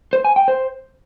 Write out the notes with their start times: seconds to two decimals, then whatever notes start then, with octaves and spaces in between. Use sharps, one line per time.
0.13 C5
0.25 G#5
0.36 G5
0.48 C5